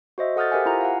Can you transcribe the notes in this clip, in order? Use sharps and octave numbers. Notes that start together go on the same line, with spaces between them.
F#4 C5 D#5 E5
A4 F#5 D#6 F6 G6 A6
G4 A#4 C5 E5 F#5 G#5
E4 F4 G#5 A#5
F5 F#5